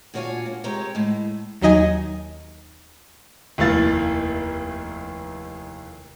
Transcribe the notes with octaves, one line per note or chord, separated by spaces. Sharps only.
A#2 D4 F#4 C#5 F5 G#5
A#2 A#3
C3 G#3 G4 A#4 C#5 A#5
A2 G#3
D#2 F#3 D#4 D#5 G#5
F1 D#2 A3 E4 F5 A6